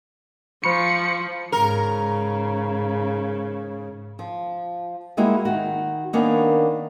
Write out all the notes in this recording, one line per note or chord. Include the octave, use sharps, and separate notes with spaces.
F3 C5 B5 C#6 C#7
G#2 C#3 A#4
F3
G3 G#3 A#3 E4 F#4 D#5
D#3 F#4
D#3 A#3 B3 C#4 D4